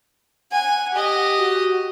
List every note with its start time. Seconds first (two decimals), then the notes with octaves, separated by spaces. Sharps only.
0.52 F#5 G#5
0.93 G4 D#5
1.39 F#4